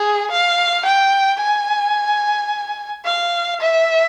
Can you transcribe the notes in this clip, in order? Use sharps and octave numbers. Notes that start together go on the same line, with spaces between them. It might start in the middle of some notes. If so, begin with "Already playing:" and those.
Already playing: G#4
F5
G5
G#5
F5
E5